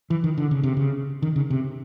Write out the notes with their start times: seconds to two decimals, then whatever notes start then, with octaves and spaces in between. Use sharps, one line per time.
0.10 E3
0.24 D#3
0.37 D3
0.51 C#3
0.63 C3
0.77 C#3
1.22 D#3
1.36 C#3
1.50 C3